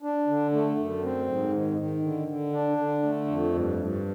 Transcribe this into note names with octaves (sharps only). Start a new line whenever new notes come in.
D4
D3
A3
F#2
C4
G#2
D#3
D#3
D3
D3
D4
D3
A3
F2
G2
G2